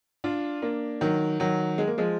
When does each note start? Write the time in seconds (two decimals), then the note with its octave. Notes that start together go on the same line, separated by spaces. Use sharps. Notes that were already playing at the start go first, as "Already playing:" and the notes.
0.24 D4 F4
0.62 A#3 D4
1.01 D#3 F#3
1.40 D#3 F#3
1.78 G#3
1.87 A#3
1.98 F3 G#3